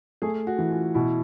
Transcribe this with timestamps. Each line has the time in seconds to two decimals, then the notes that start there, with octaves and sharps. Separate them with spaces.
0.22 A3 G#4
0.47 F#4
0.59 E3
0.71 F4
0.95 B2 E4